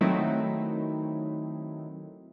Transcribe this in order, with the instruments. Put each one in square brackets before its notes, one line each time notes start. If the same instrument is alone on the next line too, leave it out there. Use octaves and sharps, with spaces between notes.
[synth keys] D#3 F#3 A3 C4 D#4 E4